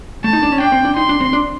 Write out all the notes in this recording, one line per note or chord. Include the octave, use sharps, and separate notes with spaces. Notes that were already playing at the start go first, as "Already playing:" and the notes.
A3 A5
D#4
D4
C#4
D4 G5
C4
D4
D#4 C6
D4
C4
D4